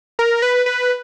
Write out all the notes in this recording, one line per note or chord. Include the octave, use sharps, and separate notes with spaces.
A#4
B4
B4